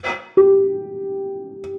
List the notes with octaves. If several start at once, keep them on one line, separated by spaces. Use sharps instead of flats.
G4